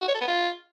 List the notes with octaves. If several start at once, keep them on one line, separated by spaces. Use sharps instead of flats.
F#4
C#5
A4
B3
F4